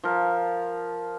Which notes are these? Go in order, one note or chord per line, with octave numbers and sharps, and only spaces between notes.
F3 A#4